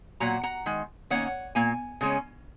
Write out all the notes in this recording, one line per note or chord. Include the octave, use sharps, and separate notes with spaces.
A#2 F#3 A#3 F#5 A#5
F#5 A#5
D#3 G#3
D#3 A#3 C#4 C#5 F#5
A#2 A#3 G#5
C#3 G#3 C#4